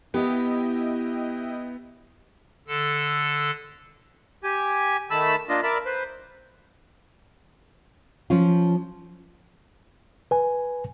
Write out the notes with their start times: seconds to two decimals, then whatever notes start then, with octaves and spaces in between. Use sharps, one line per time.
0.14 B3 E4 G4 D#5 G5
2.68 D3 A4 E6
4.44 G4 G#5
5.11 D#3 A3 A5 B5 E6
5.49 A#3 D4 F4 D#5
5.63 A#4 D5 E5 A5 B5
5.86 B4 C5
8.30 F3 C#4 F4
10.31 B4 G#5